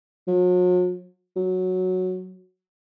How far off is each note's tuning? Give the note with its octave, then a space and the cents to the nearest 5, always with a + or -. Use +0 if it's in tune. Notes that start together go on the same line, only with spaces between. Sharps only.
F#3 -45
F#3 -5